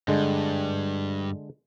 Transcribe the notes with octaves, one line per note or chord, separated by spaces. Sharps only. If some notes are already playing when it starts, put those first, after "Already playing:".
G2 D3 G#3